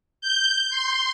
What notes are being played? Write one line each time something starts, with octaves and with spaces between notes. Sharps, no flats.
G6
C6